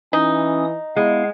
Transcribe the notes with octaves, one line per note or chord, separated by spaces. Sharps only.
E3 C#4 D#4 D#6
G#3 B3 E4 F5